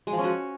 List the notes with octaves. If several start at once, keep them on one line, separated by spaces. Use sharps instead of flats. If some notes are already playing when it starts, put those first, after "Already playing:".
G#3
F3
C#4
F#4